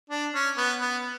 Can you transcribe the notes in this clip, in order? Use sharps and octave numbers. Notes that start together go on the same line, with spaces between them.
D4
C#4
B3
B3